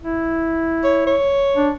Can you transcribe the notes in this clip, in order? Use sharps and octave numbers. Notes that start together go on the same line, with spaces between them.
E4
C#5
C#5
D4